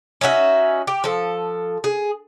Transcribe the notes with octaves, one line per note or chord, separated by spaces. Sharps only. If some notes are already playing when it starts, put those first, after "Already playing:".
C#4 D#4 F#4 E5
G4
F3 A4
G#4